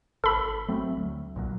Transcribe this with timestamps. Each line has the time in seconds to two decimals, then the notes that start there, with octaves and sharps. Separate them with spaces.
0.24 G#1 A4 B5
0.68 F#3 A3 C4
0.96 D2
1.36 B1 A#2 F#3